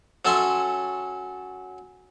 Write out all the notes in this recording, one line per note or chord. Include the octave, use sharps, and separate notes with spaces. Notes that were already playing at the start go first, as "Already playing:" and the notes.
F#3 C#4 A4 E5 C6